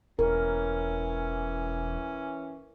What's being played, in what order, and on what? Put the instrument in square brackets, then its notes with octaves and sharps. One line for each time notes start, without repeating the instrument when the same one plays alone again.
[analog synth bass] E1 [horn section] E3 C#4 [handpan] A#4